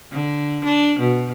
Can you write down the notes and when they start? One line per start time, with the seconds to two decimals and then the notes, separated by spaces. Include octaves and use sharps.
0.12 D3
0.65 D4
0.99 B2